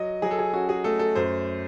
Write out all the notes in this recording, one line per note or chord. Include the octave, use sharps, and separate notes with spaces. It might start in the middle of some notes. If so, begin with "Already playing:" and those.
Already playing: F#3 D#5
F#3 G#4
A4
G#4
C#4 F#4
G#4
A3 A4
A4
F#2 C5